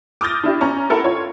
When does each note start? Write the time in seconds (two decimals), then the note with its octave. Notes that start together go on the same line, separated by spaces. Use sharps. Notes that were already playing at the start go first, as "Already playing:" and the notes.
0.21 D6 D#6 F6 G6 A6 A#6
0.43 D4 E4 G4
0.61 C#4 A#5 C#6
0.90 E4 A4 A#4 F#5
1.04 F4 C#5